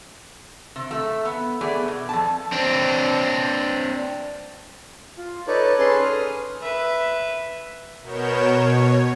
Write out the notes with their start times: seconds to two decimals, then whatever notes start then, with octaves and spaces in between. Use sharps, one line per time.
0.76 C3
0.91 A3 E5
1.25 B3
1.61 A3 B3 G#4 D5
1.88 B2
2.09 F2 A5
2.52 C4 D4
5.17 F4
5.47 D#4 A4 B4 C#5 D5
5.79 C#4 G#4 A4 B4 C6
6.02 D#6 F6
6.62 B4 E5
8.02 B2 B3 A#4 C#5 G6 E7
8.47 B2 C#5